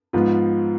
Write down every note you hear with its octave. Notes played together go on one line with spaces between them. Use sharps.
G#2 F3 B3 F4